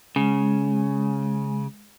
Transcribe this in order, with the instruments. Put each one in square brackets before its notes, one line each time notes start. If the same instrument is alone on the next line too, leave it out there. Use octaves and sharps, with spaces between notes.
[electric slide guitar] C#3 [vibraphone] G#3